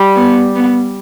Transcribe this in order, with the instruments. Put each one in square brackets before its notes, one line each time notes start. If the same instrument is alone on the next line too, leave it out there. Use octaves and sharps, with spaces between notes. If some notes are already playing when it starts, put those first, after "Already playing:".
Already playing: [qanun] G3
[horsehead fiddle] B3
B3